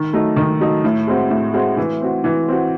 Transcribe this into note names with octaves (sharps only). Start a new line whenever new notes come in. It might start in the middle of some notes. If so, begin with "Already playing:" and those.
Already playing: D#3
F#3 A3 D#4
D#3
F#3 A3 D#4
A2
G#3 C4 F#4
A2
G#3 C4 F#4
E3
C4 F#4
E3
C4 F#4